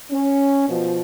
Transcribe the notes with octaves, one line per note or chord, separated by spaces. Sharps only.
C#4
B2 F3